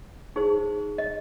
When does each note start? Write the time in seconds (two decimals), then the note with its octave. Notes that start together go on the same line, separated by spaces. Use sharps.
0.36 D#4 G#4 C5
0.98 D#5